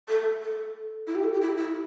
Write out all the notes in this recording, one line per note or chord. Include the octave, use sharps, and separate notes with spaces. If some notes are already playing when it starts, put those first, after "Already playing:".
A4
A4
E4
G4
A4
G4
E4
E4